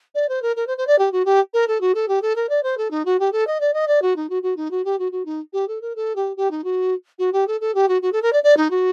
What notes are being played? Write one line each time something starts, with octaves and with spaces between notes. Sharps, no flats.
D5
C5
A#4
A#4
C5
C5
D5
G4
F#4
G4
A#4
A4
F#4
A4
G4
A4
A#4
D5
C5
A4
D#4
F#4
G4
A4
D#5
D5
D#5
D5
F#4
D#4
F#4
F#4
D#4
F#4
G4
F#4
F#4
D#4
G4
A4
A#4
A4
G4
G4
D#4
F#4
F#4
G4
A4
A4
G4
F#4
F#4
A4
A#4
D5
D5
D#4
F#4